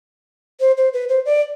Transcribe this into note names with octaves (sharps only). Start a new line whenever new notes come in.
C5
C5
B4
C5
D5